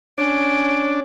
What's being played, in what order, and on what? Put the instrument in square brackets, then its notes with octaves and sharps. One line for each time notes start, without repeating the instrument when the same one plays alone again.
[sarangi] C#4 [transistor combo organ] D4 [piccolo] D7